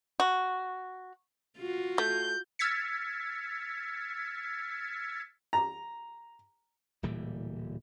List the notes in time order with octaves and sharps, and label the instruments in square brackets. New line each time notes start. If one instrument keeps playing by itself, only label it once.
[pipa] F#4
[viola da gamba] F4 F#4
[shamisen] A3 [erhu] G6
[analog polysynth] E6 F6 G#6 A6 B6 C#7
[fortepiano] A#5
[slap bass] D1 A#2 E3 G3